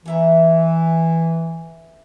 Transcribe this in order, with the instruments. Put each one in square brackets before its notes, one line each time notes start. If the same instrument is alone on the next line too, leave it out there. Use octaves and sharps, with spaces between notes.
[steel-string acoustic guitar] D3 E5 A#5 [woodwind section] E3